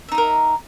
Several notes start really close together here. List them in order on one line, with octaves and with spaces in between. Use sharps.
E5 D#4 D#5 A#4